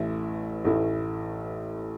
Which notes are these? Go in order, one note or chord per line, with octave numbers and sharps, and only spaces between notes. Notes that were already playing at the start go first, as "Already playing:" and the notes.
Already playing: A1 A2 E3 A3 E4
A1 A2 E3 A3 E4